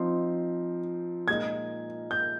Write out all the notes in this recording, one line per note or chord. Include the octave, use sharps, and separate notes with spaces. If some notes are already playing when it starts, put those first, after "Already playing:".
Already playing: F3 C4 D#4 C6
A#2 G#3 D#4 G#6
G6